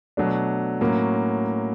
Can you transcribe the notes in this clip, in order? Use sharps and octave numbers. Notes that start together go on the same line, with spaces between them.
B2 F#3 A3 D4
A2 F#3 A#3 C#4